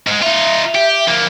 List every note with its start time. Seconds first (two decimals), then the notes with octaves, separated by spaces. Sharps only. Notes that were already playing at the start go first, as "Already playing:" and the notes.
0.07 G#2 G#3
0.22 D#4 F4 E5
0.75 G4
1.08 F2 A#3